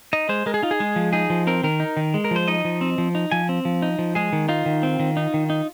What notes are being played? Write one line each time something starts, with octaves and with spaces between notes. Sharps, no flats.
D#4 D#5
G#3 C5
G#3 A#4
G#4
D#4 F4
G#4
G#3
F3
D#4 G#4
F3
C4 A#4
D#3 A#4
D#4
D#3
G#3
A#4
F3 C5
D#4 D#5
F3
C4
F3
D#4
F3 G#5
C4
F3
D#4
F3
G#3 G#4
D#3
D#4 F4
D#3
C4
D#3
D#4
D#3
D#4